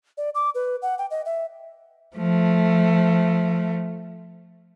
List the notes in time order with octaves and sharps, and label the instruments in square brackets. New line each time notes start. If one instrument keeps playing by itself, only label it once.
[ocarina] D5
D6
B4
F#5
G5
D#5
E5
[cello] F3 A3